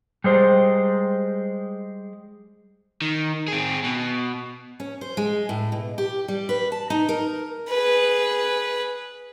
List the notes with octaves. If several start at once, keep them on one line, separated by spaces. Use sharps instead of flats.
G3 G#3 C5
D#3
C4 G#4
B2
C#4
C5
G#3
A2
B2
G4
G3
B4
A5
D#4
A#4
G#4 B4